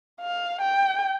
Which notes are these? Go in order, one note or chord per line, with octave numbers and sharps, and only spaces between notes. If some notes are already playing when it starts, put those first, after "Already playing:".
F5
G5